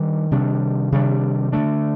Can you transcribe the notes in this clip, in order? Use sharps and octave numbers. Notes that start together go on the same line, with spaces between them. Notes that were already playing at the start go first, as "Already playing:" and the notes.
Already playing: D#3 G3 D4
C3 D#3 G3 D4
C3 D#3 G3 D4
D3 A3 D4